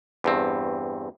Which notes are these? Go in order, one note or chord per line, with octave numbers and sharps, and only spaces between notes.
E2 G2 C4